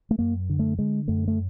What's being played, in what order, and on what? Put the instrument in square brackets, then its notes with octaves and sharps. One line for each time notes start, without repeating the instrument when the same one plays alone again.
[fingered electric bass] A3
F#2 A#3
D3
A3
D3 G#3
F#2 A3
A3